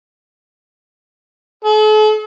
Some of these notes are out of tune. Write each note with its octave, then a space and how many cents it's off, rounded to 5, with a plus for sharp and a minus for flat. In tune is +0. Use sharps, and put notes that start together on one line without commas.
A4 -45